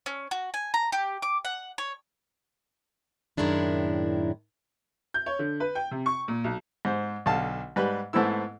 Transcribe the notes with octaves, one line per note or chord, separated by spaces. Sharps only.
C#4
F#4
G#5
A#5
G4
D6
F#5
C#5
F#2 A2 D#3 G#3 D4 E4
G6
C#5
D3
B4
G5
C3
C#6
A#2
B1
G#2 C5
B1 D3 F5 A5
G#2 G3 B4 B5
G#2 A3 B3 C4 E4 E6